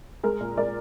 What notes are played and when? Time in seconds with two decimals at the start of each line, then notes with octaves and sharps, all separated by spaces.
0.23 G#3 A#4
0.41 A#2
0.57 G#3 A#4 D5